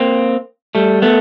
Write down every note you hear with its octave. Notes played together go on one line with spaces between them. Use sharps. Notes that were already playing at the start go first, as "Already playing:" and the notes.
Already playing: A#3 C4
G3 A3
A3 B3